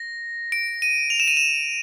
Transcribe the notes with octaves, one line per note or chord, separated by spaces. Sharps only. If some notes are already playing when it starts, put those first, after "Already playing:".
Already playing: A#6
D7
D#7
F7
E7
D#7
E7